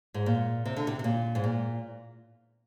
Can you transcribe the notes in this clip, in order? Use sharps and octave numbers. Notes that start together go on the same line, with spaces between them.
G#2
A#2
C3
D3
C3
C3
A#2
G#2
A#2